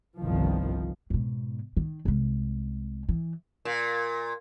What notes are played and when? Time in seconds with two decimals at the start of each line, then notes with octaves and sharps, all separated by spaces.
0.21 G1 C2 D#3 F3
1.10 G#2 B2
1.77 D#3
2.05 C2 G#3
3.09 E3
3.65 A#2